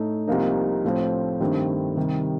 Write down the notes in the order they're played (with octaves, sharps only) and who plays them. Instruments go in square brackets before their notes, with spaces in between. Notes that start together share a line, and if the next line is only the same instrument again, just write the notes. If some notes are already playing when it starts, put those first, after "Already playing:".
Already playing: [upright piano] A2 A3 D#4
C2 C3 F3 A#3 D#4
A2 F3 A3 C4
G2 D#3 A3 C4
C3 D#3 G3